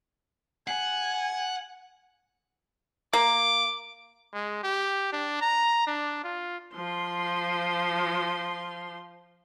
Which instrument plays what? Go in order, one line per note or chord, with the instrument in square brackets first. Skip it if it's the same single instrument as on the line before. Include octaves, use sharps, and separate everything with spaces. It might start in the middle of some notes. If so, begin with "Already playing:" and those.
[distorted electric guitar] F#5 [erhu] G#5
[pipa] A#3 [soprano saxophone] D6
[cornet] G#3
G4
D4
A#5
D4
F4
[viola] F3 C6